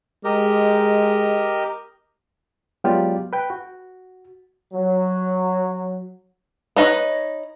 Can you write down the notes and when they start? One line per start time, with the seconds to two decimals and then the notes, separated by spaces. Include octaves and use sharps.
0.24 G#3 G4 A#4 D#5
2.84 F#3 G#3 B3 F4 G4 D5
3.33 B4 G5
3.50 F#4
4.74 F#3
6.76 B3 D#4 B4 C#5 D#5